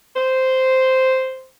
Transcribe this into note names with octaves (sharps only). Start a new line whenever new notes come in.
C5